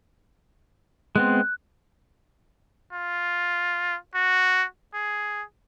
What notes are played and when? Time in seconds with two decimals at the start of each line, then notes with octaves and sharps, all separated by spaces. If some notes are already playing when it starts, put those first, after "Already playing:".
1.16 G#3 B3 C4 F#6
2.93 F4
4.14 F#4
4.94 G#4